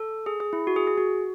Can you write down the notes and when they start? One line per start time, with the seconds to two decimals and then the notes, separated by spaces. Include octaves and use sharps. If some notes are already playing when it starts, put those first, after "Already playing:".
Already playing: A4
0.26 G#4
0.40 G#4
0.53 E4
0.67 F#4
0.76 G#4
0.87 G#4
0.97 F#4